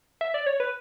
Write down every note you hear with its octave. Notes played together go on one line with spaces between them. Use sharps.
E5
D5
C#5
B4